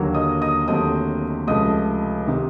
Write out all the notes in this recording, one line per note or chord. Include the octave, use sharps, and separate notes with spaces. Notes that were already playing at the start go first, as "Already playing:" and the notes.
Already playing: D#2 D3 F#3 A#3
D#5 D#6
D#5 D#6
D#2 D3 F#3 A3 C4 D#5 D#6
C#2 C3 F3 A3 D#5 D#6
C3 D#3